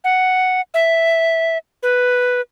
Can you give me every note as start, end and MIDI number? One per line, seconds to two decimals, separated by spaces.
0.04 0.61 78
0.74 1.58 76
1.83 2.41 71